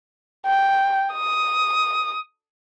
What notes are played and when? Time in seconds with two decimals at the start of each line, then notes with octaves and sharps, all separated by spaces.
0.46 G5
1.14 D#6